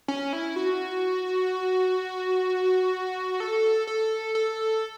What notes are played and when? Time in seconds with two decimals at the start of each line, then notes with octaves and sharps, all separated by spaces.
0.08 C#4
0.33 E4
0.56 F#4
3.40 A4
3.87 A4
4.35 A4